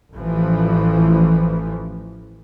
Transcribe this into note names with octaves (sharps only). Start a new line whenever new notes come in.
A1 E3 F3